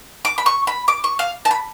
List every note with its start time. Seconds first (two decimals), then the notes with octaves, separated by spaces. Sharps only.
0.25 D6
0.38 B5
0.46 C#6
0.67 B5
0.88 D6
1.04 C#6
1.19 F5
1.45 A5
1.51 B5